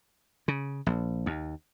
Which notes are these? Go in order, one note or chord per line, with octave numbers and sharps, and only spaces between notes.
C#3
A#1
D#2